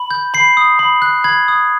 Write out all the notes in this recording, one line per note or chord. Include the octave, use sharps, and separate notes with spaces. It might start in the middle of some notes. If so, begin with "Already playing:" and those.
Already playing: B5
G6
B5 C7
D#6
B5
F#6
B5 G#6
D#6